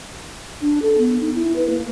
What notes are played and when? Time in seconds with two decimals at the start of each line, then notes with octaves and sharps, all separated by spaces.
0.61 D4
0.82 A4
0.98 B3
1.20 D#4
1.35 E4
1.56 B4
1.70 A#3